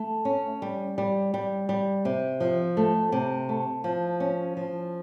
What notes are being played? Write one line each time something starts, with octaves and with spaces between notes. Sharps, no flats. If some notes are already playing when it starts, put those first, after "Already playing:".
Already playing: A3
C#4
G3
G3
G3
G3
C3
F3
A3
C3
A3
F3
C#4
F3